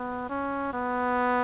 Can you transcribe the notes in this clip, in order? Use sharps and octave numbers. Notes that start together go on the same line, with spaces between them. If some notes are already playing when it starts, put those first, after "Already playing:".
Already playing: B3
C#4
B3